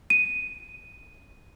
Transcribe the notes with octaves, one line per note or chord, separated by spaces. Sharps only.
D#7